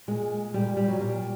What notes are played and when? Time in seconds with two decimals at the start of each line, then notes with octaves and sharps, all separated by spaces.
0.08 A#2 G#3
0.54 A#2 G3
0.77 G3
0.88 F#3
1.00 A#2 G3